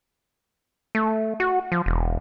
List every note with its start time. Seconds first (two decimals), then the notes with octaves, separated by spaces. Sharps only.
0.95 A3
1.40 F#4
1.72 F3
1.86 E1